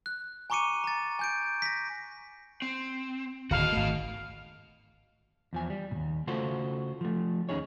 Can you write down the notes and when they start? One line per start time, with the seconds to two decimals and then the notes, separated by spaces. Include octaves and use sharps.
0.06 F#6
0.50 G#5 A#5 C#6 D6 C#7 D#7
0.84 A#5 A6
1.19 G#5 G6 D7
1.62 A#6 B6
2.62 C4
3.51 D1 D3 D#3 F#4 D#5 F5
3.72 G#1 A3
5.53 E2 F3 G#5
5.70 G3
5.91 D#2 A#2
6.27 C#3 A3 F4 F#4 A4 C5
7.01 F3 A3
7.49 D#2 C#4 D#4 G#4 C#5